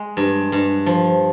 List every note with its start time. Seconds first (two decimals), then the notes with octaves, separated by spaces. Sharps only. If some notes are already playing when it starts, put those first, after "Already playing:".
Already playing: G#3
0.17 G2
0.52 G2
0.86 F3